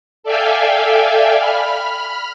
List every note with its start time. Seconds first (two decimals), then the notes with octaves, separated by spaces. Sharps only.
0.23 A4 D5 E5 F5 G5 G#5
1.39 B5 F6